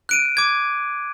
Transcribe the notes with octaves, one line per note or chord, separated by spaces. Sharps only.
F#6 D7 D#7
D6 G#6